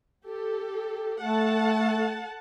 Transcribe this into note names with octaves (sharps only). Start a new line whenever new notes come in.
G4 A4
A3 A4 F#5 A5